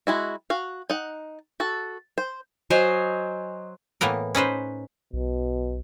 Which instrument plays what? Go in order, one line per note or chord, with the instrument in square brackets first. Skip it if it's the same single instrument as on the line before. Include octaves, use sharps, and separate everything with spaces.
[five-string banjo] G#3 E4 F#4
F#4 F5
D#4 F#5
F#4 A4
C5
[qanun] F#3 C5 D#5 G#5
[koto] A2 E3 A#3 B3 A#4
C#4 D#4 B4 C5
[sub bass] B1 [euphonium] B2